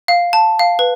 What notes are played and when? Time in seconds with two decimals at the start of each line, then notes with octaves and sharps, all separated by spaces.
0.08 F5
0.33 A5
0.59 F5
0.79 B4